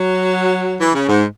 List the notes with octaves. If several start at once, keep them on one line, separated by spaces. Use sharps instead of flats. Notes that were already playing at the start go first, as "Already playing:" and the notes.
Already playing: F#3
E3
C#3
G#2